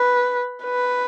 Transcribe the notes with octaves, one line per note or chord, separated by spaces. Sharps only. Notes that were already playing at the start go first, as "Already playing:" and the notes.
Already playing: B4
B4